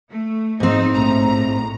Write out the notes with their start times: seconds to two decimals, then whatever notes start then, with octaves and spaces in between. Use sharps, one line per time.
0.10 A3
0.60 G#2 C4 D#4
0.93 A#1 A2 A#5